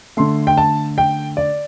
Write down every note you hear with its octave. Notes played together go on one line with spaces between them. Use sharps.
D3 A3 C6
G5
A5
G5
D5